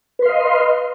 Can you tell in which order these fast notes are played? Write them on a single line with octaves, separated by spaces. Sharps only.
B4 C6 F5 D#5